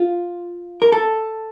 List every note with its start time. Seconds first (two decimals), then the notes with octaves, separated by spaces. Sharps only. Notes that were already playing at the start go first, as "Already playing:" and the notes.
Already playing: F4
0.82 A#4
0.92 A4